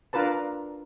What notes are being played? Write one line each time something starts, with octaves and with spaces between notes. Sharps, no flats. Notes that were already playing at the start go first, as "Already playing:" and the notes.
D4 F4 A#4 B4 A5